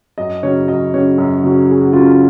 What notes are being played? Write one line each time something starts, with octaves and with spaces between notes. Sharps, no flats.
F#2 D#5
C#3 F#3 C#4 C#5
F#2 D#5
C#3 F#3 C#4 C#5
F#2
C#3 F#3 C#4
F#2 G#4
F#4
C#3 F#3 C#4 F4